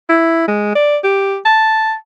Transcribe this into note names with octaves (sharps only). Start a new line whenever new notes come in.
E4
G#3
D5
G4
A5